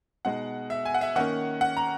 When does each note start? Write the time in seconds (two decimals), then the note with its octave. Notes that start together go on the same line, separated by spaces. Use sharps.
0.25 B2 G#3 D#4 F#5
0.70 E5
0.85 G#5
0.94 F#5
1.01 E5
1.16 D#3 A#3 C#4 F#5
1.61 F#5
1.77 A#5